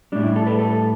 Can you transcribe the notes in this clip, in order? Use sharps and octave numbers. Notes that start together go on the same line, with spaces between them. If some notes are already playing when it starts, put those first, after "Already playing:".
A2 G3 D4
E4
A4
B4
A4